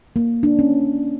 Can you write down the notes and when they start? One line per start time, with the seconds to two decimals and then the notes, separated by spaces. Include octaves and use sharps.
0.16 A#3
0.43 D4
0.59 C#4